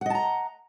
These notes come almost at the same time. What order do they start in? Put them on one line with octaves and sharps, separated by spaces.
F#5 D#5 A5 A#5